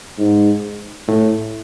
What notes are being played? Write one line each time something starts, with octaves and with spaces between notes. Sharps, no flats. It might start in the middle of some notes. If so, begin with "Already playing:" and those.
G#2
A2